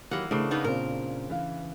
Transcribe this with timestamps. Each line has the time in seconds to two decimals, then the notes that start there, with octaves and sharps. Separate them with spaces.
0.11 D#3 E3 F#3 A#3 G4 F#5
0.31 C#3 A3 D4 E4 C5
0.51 A#3 B3 D#4
0.64 A#2 C4 A#4 C5
1.30 E3 F5